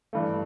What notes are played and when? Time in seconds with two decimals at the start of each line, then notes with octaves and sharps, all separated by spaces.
0.13 G2 E3 A3